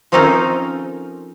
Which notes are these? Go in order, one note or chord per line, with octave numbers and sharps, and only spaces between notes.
F3 C4 C#4 D#4 A4 A#4